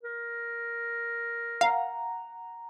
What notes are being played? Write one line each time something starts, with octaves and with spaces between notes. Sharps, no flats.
A#4
F5 F#5 A#5